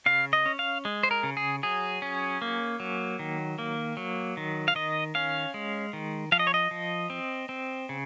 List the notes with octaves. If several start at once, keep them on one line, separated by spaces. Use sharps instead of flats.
C#3 F5
D#5
C#4
F5
G#3
C5
A#4
C#3
G#4
F#3 G#4
C#4
A#3
F#3
D#3
A#3
F#3
D#3
F5
D#3 D#5
C#4 F5
G#3
D#3
F3 F5
D#5
C#5
D#5
F3
C4
C4
C#3